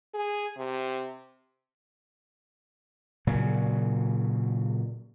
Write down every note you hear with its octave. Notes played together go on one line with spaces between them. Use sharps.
G#4
C3
A#2 C#3 F#3